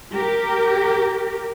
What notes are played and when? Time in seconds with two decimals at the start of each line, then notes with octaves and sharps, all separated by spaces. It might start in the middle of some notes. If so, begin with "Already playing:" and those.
0.14 G4 A#4